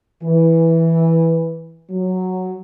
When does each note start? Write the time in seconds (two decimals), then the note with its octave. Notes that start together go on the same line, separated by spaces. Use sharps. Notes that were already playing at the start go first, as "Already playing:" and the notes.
0.23 E3
1.90 F#3